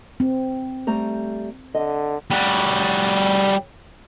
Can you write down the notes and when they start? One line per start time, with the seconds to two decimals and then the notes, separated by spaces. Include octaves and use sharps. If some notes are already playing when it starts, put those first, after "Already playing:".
0.20 C4
0.87 G3 A3 A#5
1.75 D3 D#5
2.31 G3 F#4